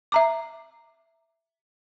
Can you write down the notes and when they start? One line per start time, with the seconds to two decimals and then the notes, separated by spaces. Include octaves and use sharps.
0.12 E5 A#5 D6